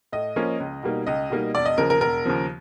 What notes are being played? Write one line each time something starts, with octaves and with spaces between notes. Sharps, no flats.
A2 D#5
F3 A#3 C#4
C#2
B2 G3 A#3 D#4
C#2 D#5
B2 G3 A#3 D#4
E1 D5
D#5
D#2 C#3 F3 A#4
A#4
E1 A#4
D#2 C#3 F3